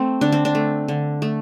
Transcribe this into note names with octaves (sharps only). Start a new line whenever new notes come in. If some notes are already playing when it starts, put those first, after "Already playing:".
Already playing: A3 C4
D3 D4
C4
D4
A3
D3
A3